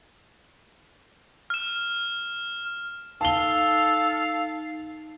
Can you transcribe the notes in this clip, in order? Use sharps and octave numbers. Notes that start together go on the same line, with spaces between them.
F6 E7
D#4 A4 F5 A5 G7